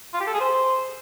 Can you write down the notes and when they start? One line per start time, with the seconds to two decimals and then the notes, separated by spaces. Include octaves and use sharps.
0.14 F4
0.20 G4
0.27 A4
0.34 G#4
0.40 C5